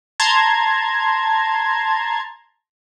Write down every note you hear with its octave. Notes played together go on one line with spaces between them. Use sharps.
A5 A#5 C6 G#6